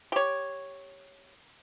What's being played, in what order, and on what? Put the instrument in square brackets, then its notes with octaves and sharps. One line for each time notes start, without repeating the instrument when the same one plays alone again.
[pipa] G4 C#5